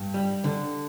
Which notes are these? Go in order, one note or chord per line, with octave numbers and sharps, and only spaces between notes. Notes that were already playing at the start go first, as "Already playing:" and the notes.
Already playing: G2
G3
D3